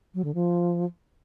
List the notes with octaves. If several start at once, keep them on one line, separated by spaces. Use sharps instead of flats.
F#3
D3
F3